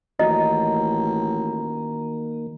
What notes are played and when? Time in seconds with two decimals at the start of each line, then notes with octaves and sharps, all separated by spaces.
0.19 A1 D#3 A#3 F#4 D#5 A#5